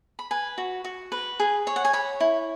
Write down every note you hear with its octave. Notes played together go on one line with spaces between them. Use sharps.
B5
B4 G#5
F#4
F#4
B4
G#4
C#5
F#5
G#5
C#5 B5
E4